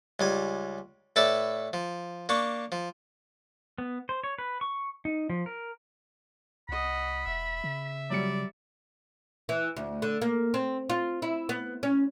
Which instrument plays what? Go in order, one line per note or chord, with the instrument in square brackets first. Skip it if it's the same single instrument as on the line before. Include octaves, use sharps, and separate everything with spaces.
[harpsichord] C#2 G3 G#5
A2 A4 B4 D5 E5
F3
A#3 D4 C#6
F3
[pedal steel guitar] B3
C5
C#5
B4
C#6
D#4
F3
A#4
[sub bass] C2 [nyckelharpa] D#5 F#5 [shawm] B5
[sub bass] E1 [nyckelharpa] E5
[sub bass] C#3
[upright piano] F#3 G3 C#7 [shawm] D5
[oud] E3
D2
D3
A#3
C4
F4
E4
B3
C#4